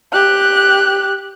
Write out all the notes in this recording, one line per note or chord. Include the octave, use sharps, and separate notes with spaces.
G4 F#6